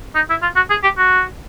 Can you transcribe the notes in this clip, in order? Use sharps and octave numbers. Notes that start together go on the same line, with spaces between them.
D#4
E4
F4
F#4
G#4
G4
F#4